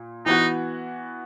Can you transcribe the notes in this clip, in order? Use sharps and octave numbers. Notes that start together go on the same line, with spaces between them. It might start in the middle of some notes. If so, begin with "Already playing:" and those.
Already playing: A#2
E3 B3 D#4 F#4